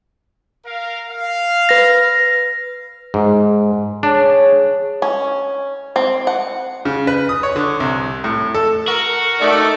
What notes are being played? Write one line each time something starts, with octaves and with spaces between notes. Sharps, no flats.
A#4 F5
F5
B4 A#6
G#2
D4 G#4 C#5
C#4
C4
F#5
C#3
B4
D#6
C#5
D3
C2
A2
A4
F#4 A#4
A3 D#4 D5 D6